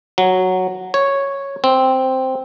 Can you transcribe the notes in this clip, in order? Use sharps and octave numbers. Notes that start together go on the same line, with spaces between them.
F#3
C#5
C4